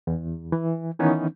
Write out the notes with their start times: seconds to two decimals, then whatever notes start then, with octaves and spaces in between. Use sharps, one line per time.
0.07 E2
0.52 E3
0.99 D#3 E3 B3 C#4 D#4